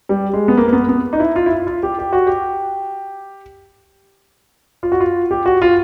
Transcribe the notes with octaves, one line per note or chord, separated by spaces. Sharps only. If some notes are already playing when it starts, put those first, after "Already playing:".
G3
G#3
B3
A#3
A#3
B3
B3
D#4
E4
F4
E4
F4
F4
G4
G4
F#4
G4
F4
F#4
F4
G4
F#4
F4